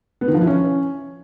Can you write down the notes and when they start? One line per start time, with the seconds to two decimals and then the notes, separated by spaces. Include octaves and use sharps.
0.21 B3
0.28 D#3
0.34 F3
0.41 E4
0.47 C#4